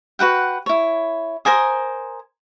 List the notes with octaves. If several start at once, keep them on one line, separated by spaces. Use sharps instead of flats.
F#4 B4 F#5 G5
E4 C#5
A#4 C5 G#5 D#6